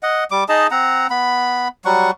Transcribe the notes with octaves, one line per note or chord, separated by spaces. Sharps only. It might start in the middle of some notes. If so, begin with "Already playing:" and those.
D#5 F#5
G3 D6
D#4 G#4 D#5 A5
C4 F#5 A#5
B3 B5
F#3 G3 F#5 C#6